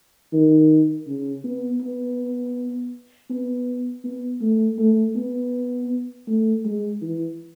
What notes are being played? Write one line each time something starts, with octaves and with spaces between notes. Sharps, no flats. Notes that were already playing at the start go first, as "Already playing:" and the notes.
D#3
C#3
B3
B3
B3
B3
A3
A3
B3
A3
G#3
E3